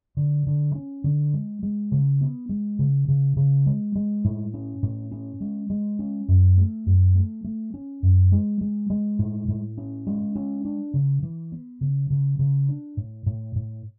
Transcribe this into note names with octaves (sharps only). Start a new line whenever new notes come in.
D3
D3
C#4
D3
G#3
G#3
C#3
B3
G#3
C#3
C#3
C#3
G#3
G#3
A2
C#4
A2
C#4
G#3
G#3
C#4
F#2
A3
F#2
A3
A3
C#4
F#2
G#3
G#3
G#3
A2
A2
C#4
G#3
C#4
D4
C#3
E3
B3
C#3
C#3
C#3
D4
A2
A2
A2